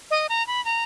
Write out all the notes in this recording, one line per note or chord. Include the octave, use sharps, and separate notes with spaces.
D#5
A#5
B5
A#5